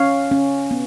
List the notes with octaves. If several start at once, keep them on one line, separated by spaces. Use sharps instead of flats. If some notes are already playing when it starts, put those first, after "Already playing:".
Already playing: C#4 C#5 F5
C#4
B3